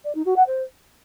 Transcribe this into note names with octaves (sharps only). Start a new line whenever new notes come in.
D5
D#4
F#4
F#5
C5